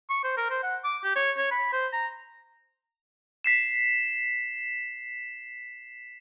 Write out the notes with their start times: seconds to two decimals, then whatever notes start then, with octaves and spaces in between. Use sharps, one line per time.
0.10 C#6
0.24 C5
0.37 A#4
0.50 C5
0.63 F#5
0.84 D6
1.04 G4
1.16 C#5
1.37 C#5
1.51 B5
1.73 C5
1.93 A#5
3.44 B6 C7 E7